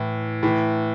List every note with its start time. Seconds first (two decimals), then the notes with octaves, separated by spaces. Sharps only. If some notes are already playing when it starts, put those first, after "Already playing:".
Already playing: A2 E3
0.43 A2 E3